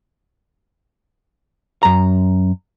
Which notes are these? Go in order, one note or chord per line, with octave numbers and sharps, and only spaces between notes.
F#2 A#5